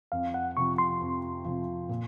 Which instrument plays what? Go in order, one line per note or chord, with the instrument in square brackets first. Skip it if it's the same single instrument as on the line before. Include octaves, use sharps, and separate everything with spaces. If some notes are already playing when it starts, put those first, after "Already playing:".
[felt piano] F2 [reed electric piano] F5
[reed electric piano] F#5
[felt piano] C3 F3 [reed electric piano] C#6
[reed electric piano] C6
[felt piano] F2
C3 F3
A#2